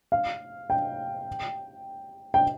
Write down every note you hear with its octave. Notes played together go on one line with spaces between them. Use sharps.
F5
G5
G5